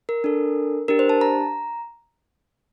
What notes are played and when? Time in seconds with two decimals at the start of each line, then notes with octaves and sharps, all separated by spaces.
0.09 A#4
0.24 D4 A4
0.88 D4 G4 A#4
0.99 C5
1.09 A5
1.21 A#5